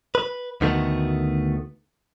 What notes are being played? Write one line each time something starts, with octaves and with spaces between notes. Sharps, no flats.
B4
D2 D#3 A3 B3 F#4